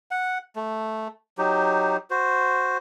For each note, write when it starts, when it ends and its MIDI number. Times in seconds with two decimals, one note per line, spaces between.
0.11 0.38 78
0.56 1.08 57
1.38 1.97 54
1.38 1.97 63
1.38 1.97 67
2.11 2.78 66
2.11 2.78 72